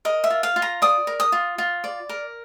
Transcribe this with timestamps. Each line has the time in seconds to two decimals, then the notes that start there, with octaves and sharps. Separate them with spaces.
0.05 A#4 D#5
0.24 E5
0.30 F4
0.43 F5
0.56 F4
0.62 A#5
0.82 D5 D#6
1.07 A#4
1.20 D#6
1.32 F4
1.58 F4
1.84 D5
2.09 A#4